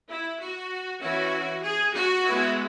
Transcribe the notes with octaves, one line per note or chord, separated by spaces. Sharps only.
E4
F#4
E3 C#4 E4 F#4
G#4
F#4
G#3 B3 E4